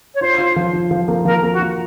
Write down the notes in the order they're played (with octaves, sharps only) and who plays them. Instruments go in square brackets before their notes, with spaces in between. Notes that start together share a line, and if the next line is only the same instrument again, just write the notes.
[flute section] C#5
[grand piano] F4 [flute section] C5
[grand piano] F4
F3
F4
F3
A#3
[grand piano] F3 [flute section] A#4
[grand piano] A#3
[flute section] F#4
[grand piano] F4